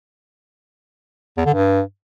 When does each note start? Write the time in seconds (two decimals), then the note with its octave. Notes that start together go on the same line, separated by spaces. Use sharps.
1.37 E2
1.46 D3
1.54 G2